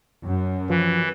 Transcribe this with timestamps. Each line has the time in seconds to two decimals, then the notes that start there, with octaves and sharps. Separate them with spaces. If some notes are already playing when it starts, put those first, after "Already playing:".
0.24 F#2
0.70 E3 F3